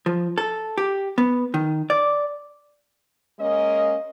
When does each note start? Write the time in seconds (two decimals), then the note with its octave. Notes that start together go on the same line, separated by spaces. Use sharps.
0.06 F3
0.38 A4
0.78 G4
1.18 B3
1.54 D#3
1.90 D5
3.39 G#3 A#3 C#4 D#5